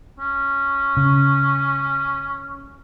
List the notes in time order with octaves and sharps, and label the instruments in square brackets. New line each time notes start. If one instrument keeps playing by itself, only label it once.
[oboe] C#4
[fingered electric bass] C#3